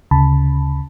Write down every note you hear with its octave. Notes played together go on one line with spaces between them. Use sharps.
D2 C#3 A5 B5